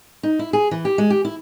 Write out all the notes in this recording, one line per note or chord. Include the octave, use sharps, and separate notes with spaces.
D#4
E4
G#4
E3
G4
G#3
G4
E4